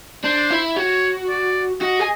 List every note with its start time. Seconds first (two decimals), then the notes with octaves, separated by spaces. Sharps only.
0.24 D4 C5
0.51 E4
0.76 F#4 C#5
1.29 D5
1.81 F#4 D#5
2.00 G#4